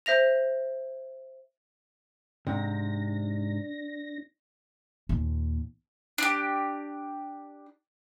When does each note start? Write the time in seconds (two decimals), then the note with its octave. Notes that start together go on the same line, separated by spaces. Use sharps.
0.06 C5 E5 A#6 F7
2.47 G#2 C3 D4 A#6
5.09 D#2 A#2
6.18 D4 G4